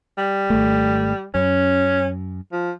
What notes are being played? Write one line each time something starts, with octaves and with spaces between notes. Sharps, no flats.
G3
G#1 A3
F#2 C#4
F3